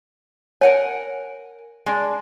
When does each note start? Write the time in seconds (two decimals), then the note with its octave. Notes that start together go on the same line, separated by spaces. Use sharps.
0.61 A#4 C#5 F#5 G#5
1.86 G#3 D4